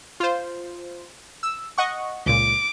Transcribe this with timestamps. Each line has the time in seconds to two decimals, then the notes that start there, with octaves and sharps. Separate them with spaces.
0.20 F4 C5
1.43 E6
1.78 D#5 F#5 C#6
2.26 C#2 A#2 D6